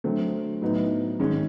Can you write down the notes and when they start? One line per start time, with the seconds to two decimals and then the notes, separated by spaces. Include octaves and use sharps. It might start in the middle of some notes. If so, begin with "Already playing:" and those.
0.04 D3 F#3 A3 C4
0.61 A2 F#3 B3 D#4
1.19 G#2 D#3 G#3 C#4